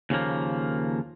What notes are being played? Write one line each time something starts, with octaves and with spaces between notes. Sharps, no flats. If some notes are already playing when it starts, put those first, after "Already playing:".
D#2 C#3 F3 A#3